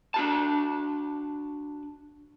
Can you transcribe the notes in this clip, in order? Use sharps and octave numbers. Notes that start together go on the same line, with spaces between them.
D4 F#4 A5